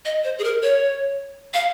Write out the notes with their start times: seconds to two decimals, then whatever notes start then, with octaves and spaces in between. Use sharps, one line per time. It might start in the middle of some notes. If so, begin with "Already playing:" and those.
0.06 D#5
0.24 C5
0.39 G#4
0.44 A#4
0.63 C#5
1.54 F5